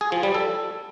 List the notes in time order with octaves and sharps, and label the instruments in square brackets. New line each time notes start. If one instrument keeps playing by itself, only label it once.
[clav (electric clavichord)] G#4
F3
G3
A4